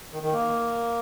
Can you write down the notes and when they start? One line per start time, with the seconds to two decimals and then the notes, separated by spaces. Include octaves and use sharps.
0.13 D#3
0.23 D#3
0.33 A#3